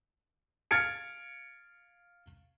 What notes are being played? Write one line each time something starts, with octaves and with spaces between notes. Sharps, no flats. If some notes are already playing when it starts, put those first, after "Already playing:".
F5 F6 G#6 A6 C#7 D7